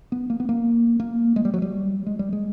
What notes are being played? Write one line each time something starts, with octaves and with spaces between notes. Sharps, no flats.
B3
A#3
B3
A#3
A#3
G#3
G3
F#3
G3
G#3
G3
G#3